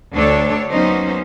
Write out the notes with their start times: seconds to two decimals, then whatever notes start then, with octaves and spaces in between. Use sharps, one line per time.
0.15 D2 D4 A4 C#5
0.70 F#3 A#3 B3 C#4 D#4 C5